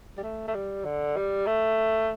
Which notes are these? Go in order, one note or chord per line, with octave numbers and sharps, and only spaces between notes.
G3
A3
A3
G3
D3
G3
A3